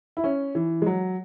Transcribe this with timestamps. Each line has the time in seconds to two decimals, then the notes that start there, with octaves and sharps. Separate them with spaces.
0.17 E4
0.24 C#4
0.55 E3
0.82 G#3
0.86 F#3